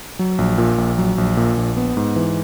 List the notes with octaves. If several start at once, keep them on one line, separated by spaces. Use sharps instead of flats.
F#3
A#1
A#2
A#1
F#3
A#1
A#2
A#1
B3
G#2
E3